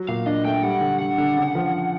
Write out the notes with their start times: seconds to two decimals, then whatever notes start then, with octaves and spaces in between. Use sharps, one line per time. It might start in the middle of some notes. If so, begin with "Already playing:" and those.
Already playing: F#3
0.08 A#2 F5
0.26 D4 D#5
0.45 A3 G5
0.63 G3 F#5
0.81 D3
0.99 D3 F#5
1.18 D3
1.37 C#3
1.55 F3